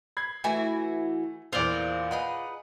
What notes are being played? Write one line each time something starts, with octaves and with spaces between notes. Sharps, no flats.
B5 G#6 C7
E3 A3 E4 F#4 G#5
E2 A#2 F4 C5 D5
D#4 G#4 B4 F#5